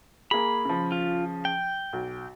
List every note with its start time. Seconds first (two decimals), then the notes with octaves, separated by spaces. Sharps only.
0.31 A#3 G#4 B5
0.65 C#3 F3
0.92 F4
1.45 G5
1.93 B1